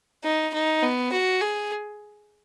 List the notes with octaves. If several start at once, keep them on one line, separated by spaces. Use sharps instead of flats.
D#4
D#4
B3
F#4
G#4